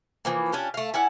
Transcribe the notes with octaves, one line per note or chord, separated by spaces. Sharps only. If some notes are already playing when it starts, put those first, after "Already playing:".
E3 F3 A#3
C#4 D4 F4 G4
A3 F5
C#4 E4 D5 F#5